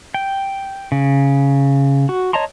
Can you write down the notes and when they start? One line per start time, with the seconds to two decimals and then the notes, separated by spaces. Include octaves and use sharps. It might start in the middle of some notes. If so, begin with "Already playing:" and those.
0.14 G5
0.92 C#3
2.09 F#4
2.33 C#5 D#5 A5 A#5 C6